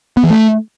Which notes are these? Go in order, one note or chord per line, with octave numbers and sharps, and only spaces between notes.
B3
E3
A3